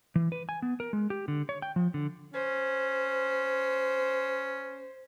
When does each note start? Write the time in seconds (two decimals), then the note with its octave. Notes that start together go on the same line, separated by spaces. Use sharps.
0.16 E3
0.32 B4
0.49 G#5
0.62 B3
0.80 A#4
0.93 G#3
1.10 G4
1.28 D3
1.49 C#5
1.62 G5
1.76 F3
1.94 D3
2.34 C#4 C5